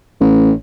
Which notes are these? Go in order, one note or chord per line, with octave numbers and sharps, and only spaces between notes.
A1